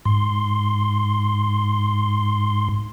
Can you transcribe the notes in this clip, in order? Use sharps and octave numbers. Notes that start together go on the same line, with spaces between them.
G#2 C6